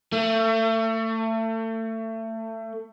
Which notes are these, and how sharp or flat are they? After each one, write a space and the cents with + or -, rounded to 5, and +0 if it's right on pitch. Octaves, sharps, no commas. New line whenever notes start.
A3 +30